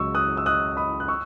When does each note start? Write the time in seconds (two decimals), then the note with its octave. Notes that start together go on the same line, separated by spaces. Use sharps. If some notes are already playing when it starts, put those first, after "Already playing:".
Already playing: C#2 C#3 F#3 C#6 E6
0.15 D#6 F#6
0.37 E6
0.46 D#6 F#6
0.77 B5 D#6
1.00 F#6
1.08 C#6 E6